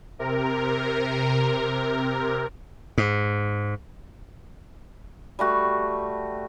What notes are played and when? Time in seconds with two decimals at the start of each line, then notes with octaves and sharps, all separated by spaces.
0.19 C3 A#4
2.98 G#2
5.39 G3 A3 F#4